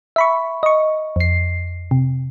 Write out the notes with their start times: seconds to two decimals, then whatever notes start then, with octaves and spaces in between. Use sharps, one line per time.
0.16 E5 B5 C#6
0.63 D#5 C#6
1.16 F2 C7
1.91 C3